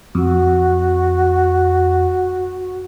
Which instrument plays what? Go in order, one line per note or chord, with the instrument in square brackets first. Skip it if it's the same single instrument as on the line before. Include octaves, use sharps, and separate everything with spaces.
[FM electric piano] F2 [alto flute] F#4